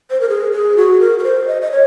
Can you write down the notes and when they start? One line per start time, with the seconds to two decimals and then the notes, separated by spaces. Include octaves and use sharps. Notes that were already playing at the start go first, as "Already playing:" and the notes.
0.11 C5
0.21 A#4
0.29 G#4
0.52 G#4
0.77 F#4
1.00 A#4
1.19 A#4
1.24 C5
1.48 D#5
1.62 D#5
1.71 C#5